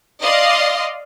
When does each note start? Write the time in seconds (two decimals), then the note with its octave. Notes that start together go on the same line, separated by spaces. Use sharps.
0.21 D5 D#5 F5 C6